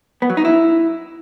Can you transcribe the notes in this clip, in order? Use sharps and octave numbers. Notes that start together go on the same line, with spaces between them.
B3
F#3
D#4
E4